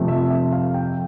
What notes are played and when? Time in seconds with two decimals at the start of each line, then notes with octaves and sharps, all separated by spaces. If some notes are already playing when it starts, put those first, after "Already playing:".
Already playing: F2 C3 F3 A3
0.08 E5
0.30 E5
0.52 F5
0.74 G5